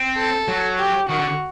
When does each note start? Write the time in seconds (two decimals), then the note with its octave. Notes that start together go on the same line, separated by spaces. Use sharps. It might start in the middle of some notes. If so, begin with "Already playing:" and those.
Already playing: C4
0.17 A4
0.48 F#3
0.79 G4
1.09 D#3 F#4
1.19 D3